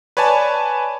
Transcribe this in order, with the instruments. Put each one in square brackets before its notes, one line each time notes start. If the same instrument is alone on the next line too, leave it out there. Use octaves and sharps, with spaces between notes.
[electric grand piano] B4 C#5 D5 G#5 A5